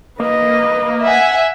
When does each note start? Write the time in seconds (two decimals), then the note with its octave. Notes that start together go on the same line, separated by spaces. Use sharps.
0.20 A#3 B4 D#5
1.04 E5 F#5 G#5